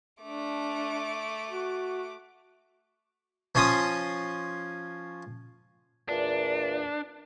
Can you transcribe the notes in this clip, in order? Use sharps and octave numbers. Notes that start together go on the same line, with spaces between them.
A3 D4 D6
F#4
F3 C#4 C#5 C6 D#6
E2 A#2 D4